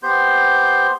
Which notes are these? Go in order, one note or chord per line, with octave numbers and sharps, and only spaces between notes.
B3 G4 C5 C6 G6